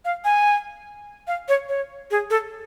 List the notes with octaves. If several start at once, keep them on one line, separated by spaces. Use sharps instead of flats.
F5
G#5
F5
C#5
C#5
G#4
A4